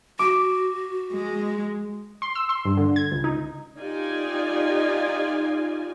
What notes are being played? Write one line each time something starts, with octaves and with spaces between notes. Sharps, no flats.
F#4 D6
G#3
C6
E6
C6
G2
D3
G#6
C#2
D#4
D#4 F4 G4 D5 G#5